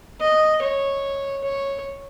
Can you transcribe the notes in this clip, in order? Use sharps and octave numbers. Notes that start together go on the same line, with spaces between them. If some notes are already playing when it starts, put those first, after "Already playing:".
D#5
C#5
C#5